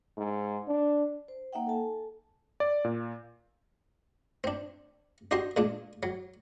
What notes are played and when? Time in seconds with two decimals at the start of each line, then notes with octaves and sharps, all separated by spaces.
0.17 G#2
0.68 D4
1.28 C5
1.53 A#3 D#4 E5 F#5 G5
1.67 A4 G#5 A5
2.60 D5
2.84 A#2
4.44 C4 D4
5.31 D4 F#4 G4 D#5 C6
5.56 A#2 G#3 D4
6.03 F#3